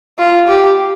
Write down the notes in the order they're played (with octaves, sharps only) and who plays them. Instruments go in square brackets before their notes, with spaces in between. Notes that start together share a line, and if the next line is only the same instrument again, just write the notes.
[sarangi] F4
G4